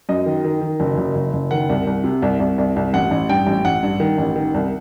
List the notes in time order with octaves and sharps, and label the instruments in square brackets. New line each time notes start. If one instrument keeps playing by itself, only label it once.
[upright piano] F#2 D#5
D#3
D#3
D#3
F#1
F#1
F#1
F#1
D#3 F#5
C2
C2
C3
C2
C2
C2
C2
A1 F#5
A1
G2 G5
A1
A1 F#5
G2
D#3
A1
D#3
C2